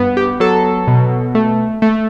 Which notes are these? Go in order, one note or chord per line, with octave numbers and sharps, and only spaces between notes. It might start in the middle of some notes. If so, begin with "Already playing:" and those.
Already playing: G2 B3
G4
F#3 A4
B2
A3
A3